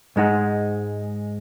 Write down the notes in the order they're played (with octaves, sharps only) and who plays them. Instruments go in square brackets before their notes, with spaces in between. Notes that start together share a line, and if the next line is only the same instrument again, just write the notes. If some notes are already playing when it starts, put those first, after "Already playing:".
[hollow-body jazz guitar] G#2 G#3 D#4 F#5